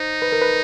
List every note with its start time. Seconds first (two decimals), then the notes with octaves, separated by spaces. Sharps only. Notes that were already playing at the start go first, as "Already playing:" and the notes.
Already playing: D#4 C5
0.22 B4
0.32 A#4
0.42 B4